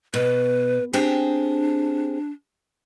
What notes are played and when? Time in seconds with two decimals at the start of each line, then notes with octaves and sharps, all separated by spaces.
0.14 B2 B4
0.93 C4 D4 G4 G#4